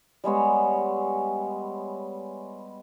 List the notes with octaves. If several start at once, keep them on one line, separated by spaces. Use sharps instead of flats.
G3 G#3 B3 C#5